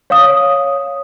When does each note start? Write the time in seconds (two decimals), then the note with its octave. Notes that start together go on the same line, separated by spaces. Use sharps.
0.10 C#5 F5 D#6